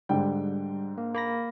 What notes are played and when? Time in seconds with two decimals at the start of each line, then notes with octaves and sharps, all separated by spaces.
0.09 G#2 D3 G3 G5
0.98 A#3
1.14 A#3 B5 A#6